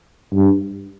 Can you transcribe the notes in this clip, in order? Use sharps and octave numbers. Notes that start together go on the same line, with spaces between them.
G2